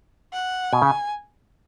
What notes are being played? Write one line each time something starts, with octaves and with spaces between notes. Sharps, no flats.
F#5
B2 G#5
C#3